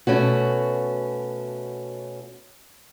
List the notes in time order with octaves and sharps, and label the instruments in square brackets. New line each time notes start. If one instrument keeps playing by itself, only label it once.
[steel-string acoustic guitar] B2 A3 C#4 F#4